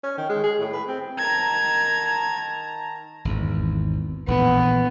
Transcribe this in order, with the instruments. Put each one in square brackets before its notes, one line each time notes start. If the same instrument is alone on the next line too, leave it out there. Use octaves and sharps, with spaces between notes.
[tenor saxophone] C#4
D#3
G#3
G#4
A2
B4
C4
[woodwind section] D#3 A5 A#5 [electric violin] G#6
[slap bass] G#1 E2
[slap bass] A#1 A2 E3 [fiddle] B3